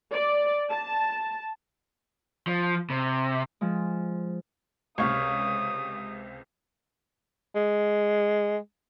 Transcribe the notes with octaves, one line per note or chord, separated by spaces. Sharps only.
D5
A5
F3
C3
F3 G#3
C#2 C3 C#5 F5 D#6
G#3